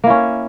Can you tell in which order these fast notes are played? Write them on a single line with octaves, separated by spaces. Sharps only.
A#3 E4 C#4